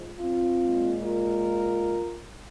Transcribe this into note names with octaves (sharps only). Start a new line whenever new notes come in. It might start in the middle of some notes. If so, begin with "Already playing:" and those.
Already playing: G#2 F3 G#3
C4 F4
A#2 G#3
F4 A#4